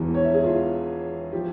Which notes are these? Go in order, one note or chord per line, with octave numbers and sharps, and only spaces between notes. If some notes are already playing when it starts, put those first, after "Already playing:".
Already playing: E1 E2 E3
C#5
E5
G#4
F4
F3 G4